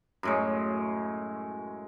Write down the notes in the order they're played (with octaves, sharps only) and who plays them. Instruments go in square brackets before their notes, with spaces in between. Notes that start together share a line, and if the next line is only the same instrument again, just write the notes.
[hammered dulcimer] F#2 A2 G#3